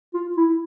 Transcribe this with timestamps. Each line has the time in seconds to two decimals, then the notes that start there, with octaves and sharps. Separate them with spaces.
0.14 F4
0.37 E4